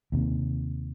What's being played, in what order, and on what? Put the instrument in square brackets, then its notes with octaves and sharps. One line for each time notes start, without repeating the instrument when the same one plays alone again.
[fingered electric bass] D#2 C3